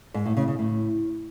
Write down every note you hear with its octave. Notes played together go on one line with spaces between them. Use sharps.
G#2
A2
C#3
C#3
A2